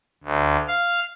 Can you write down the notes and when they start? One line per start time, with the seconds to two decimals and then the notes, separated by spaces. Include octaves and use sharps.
0.23 D2
0.68 F5